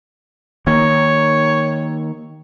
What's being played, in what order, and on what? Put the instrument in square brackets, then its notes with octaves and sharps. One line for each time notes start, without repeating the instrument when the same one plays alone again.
[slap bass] D#3 A#3 [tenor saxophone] C#5